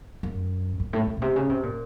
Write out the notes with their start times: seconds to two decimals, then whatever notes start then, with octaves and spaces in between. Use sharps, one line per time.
0.23 F#2
0.80 F#2
0.93 A2
1.07 A2
1.17 A#2
1.22 C3
1.36 C#3
1.49 C3
1.63 A#2